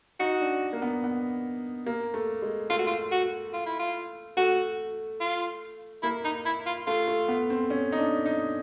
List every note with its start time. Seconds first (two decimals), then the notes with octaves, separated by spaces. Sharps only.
0.20 D#4 F#4
0.41 D4
0.73 A#3
0.82 B3
1.04 B3
1.86 A#3
2.14 A3
2.42 G#3
2.70 A3 F4
2.79 F#4
2.87 F4
3.12 F#4
3.54 F4
3.66 E4
3.79 F4
4.37 A3 F#4
5.20 F4
6.03 A#3 E4
6.25 D#4
6.46 E4
6.66 F4
6.87 A3 F4
7.08 A3
7.28 B3
7.50 C4
7.70 C#4
7.92 D#4
7.98 D4
8.26 D#4